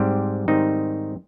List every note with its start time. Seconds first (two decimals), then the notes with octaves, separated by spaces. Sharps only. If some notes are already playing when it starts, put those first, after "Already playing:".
Already playing: G#2 G3 C4 G4
0.48 G#2 D#3 G3 C4 D#4